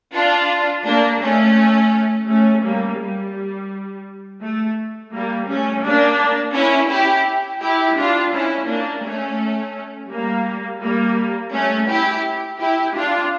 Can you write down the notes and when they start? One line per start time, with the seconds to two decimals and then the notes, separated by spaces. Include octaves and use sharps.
0.14 D4 F4
0.86 A#3 D4
1.21 A3 C#4
2.28 A3 C#4
2.64 G3 A#3
2.99 G3
4.42 A3
5.12 G3 A#3
5.48 A3 C#4
5.84 A#3 D4
6.55 C#4 E4
6.92 E4 G4
7.62 E4 G4
7.98 D4 F4
8.34 C#4 E4
8.68 A#3 D4
9.04 A3 C#4
10.11 G3 A#3
10.82 G3 A#3
11.53 A3 C#4
11.89 E4 G4
12.60 E4 G4
12.96 D4 F4